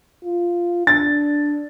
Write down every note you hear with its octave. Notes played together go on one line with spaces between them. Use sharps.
F4
D4 A6